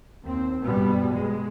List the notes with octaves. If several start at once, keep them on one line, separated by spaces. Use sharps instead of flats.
D#2 C4
G2 B2 G3 B3
G#3